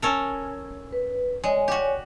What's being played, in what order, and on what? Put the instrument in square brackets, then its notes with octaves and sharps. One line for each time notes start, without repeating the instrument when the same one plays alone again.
[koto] C#4 A4 A#4
[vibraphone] B4
[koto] G#3 [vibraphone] C#5 D5 G#5
[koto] F#4 G4